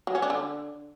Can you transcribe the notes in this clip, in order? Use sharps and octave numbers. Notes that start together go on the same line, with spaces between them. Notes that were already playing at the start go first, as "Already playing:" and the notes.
F#3
C#4
D4
D3